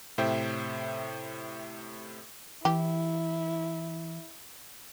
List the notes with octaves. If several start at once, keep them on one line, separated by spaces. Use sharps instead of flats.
A2 C3 C5 E5 G5
E3 E4 G4